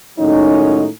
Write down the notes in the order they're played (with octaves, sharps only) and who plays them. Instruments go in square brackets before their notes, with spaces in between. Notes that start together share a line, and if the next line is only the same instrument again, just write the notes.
[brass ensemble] A2 D#3 F#3 G#3 C#4 D#4